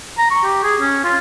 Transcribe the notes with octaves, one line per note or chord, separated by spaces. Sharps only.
A#5
C#6
G4
G#4
C#4
F4